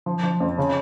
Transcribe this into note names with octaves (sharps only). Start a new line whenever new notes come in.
F3
F3
F2
C#3